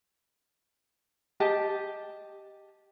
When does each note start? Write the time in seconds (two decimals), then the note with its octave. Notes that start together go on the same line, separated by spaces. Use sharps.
1.40 G4 D#5 A5